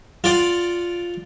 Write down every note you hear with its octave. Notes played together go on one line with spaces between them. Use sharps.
F4 D5 F#5